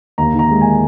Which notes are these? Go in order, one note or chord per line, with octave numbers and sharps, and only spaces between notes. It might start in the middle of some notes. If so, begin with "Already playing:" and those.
D#2 A#5
D#3
A#5
G#3
G#5